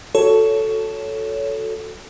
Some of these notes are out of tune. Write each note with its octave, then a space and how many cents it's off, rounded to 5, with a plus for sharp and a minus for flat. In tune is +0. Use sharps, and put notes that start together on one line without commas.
F#4 -10 A4 +0 C#5 +15